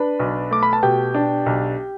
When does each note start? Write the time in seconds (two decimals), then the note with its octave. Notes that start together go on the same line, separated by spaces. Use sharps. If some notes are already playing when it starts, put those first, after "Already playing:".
Already playing: D4 B4 B5
0.19 B1
0.51 A3 D6
0.63 B5
0.73 A5
0.83 B2 G4 G5
1.14 D4
1.46 B1